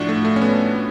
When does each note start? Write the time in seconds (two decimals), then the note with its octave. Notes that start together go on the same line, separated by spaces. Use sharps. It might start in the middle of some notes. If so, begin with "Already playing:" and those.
Already playing: A2 F3 D4 F#4
0.09 A3
0.25 A3
0.36 C#4
0.41 B3